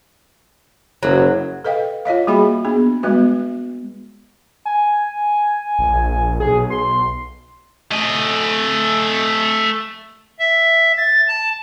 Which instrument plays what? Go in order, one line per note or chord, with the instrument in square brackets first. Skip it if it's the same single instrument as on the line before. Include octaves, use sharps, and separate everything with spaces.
[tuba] F#1 [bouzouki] F#3
[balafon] A4 B4 D#5 F5 G5
F4 C#5 D#5 F5
G3 A#3 F#4 G#4 E5 B5
B3 D4 G#4
G3 G#3 B3 F#4 B4
[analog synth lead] G#5
[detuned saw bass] A#1
[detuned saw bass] B1 [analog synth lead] G#4
[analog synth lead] C6
[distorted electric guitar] A3 D#5
[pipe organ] E5
A6
A5